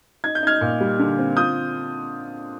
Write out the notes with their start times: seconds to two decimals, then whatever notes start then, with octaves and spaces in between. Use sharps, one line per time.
0.24 D#4 G#6
0.35 G6
0.43 D#4 F6 G#6
0.61 A#2
0.81 G3
0.99 D3
1.19 C4
1.37 F4 D#6 G6